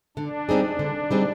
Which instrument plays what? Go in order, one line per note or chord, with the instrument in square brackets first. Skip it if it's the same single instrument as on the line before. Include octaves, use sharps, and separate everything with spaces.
[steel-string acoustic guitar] D3 [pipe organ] D4
[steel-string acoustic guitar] G3 C4 D#4 G#4
D3
G3 C4 D#4 G#4